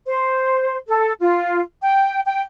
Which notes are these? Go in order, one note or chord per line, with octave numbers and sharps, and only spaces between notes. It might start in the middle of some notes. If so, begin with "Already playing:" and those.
C5
A4
F4
G5
G5